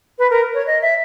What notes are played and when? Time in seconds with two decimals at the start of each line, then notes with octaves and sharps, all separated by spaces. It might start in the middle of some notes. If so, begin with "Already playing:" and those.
0.18 B4
0.30 A#4
0.54 C#5
0.66 D#5
0.81 E5